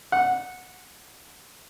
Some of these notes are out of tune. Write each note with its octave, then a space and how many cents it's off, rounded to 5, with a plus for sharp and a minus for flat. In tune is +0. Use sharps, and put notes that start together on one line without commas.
F#5 -15